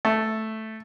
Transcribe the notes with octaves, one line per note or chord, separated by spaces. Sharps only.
A3